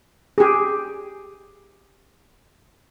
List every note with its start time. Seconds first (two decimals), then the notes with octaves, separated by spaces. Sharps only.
0.38 G4 G#4